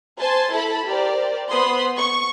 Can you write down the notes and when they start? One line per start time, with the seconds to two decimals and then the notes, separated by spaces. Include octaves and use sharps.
0.19 C5 G#5 A5 C6
0.51 E4 A4 A5 B5
0.87 G4 A#4 C5 D5
1.50 B3 C5 B5 C6 D#6
1.97 C#6